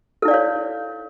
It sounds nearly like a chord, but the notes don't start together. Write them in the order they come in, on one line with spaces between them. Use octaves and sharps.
A4 E4 D5 F5 C#5